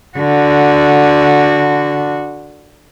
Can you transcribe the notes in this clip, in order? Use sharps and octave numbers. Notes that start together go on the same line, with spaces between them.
D3 F#4